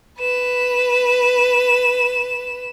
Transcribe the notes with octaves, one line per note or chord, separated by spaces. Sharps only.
B4 E7